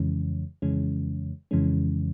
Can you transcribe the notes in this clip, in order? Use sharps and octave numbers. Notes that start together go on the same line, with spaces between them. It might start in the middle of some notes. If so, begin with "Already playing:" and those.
Already playing: F2 C#3 E3 G#3 C#4
F2 C#3 E3 G#3 C#4
F2 C#3 E3 G#3 C#4